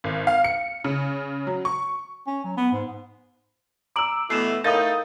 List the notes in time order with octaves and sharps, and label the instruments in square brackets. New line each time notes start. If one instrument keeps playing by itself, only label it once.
[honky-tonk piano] G#1
F5
C#7
C#3
F#3
C#6
[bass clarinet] C#4
F#3
B3
G#2
[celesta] A#5 D7 F#7 [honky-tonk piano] D6 E6
[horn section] B2 E3 A3 [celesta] C7 E7
[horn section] A2 D#4 [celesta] A#4 F5 D#7 [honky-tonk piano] D#6 G6 A6